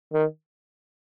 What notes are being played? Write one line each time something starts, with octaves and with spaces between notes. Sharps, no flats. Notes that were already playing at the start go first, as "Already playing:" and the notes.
D#3